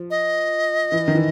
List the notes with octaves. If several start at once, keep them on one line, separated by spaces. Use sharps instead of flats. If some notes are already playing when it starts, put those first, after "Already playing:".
Already playing: F3
D#5
E3
D#3
E3